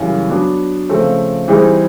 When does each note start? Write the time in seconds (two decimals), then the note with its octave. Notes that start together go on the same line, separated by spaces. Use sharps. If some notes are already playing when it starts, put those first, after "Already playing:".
Already playing: F#2 C#3 E3 G3
0.29 F#3 B3 D4
0.89 C#3 F3 A3 C4
1.48 E3 G3 C4 D#4 G#4